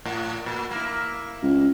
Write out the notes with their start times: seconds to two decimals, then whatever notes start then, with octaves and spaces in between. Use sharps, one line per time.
0.05 A2
0.46 A#2
0.71 A#3 E4
1.42 C#2